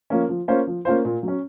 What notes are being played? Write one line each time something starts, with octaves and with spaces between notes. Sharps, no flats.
F3 A#3 C#4
F3
A#3 C#4 F4 C5
F3
A#3 C#4 F4 C5
A#2
F#3
C#4